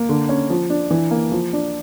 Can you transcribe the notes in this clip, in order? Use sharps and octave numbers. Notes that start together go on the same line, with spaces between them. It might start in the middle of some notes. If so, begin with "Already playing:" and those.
Already playing: A#3
D3
C#4
F3
D4
E3
A#3
F3
D4